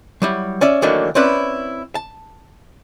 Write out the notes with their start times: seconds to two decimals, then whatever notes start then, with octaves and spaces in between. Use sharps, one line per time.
0.22 F#3 G3 E4
0.61 C#4 D5 E5
0.82 D#3 E3 F#3 A3 A#3 D4
1.15 C4 C#4 E4 B4 D5
1.95 A5